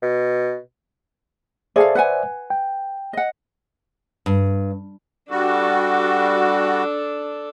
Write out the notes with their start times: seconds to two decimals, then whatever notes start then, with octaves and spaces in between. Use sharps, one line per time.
0.02 B2
1.76 G#4 A4 C5 D5 E5 F5
1.95 B4 F#5 G#5
2.50 G5
3.13 D#5 F#5
4.26 G2
5.31 G3 D4 F#4 A4